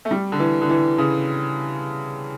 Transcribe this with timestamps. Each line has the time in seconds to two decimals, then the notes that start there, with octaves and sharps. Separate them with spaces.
0.05 A3
0.11 G3
0.32 D3
0.40 E3
0.62 D3
0.70 E3
0.98 C#3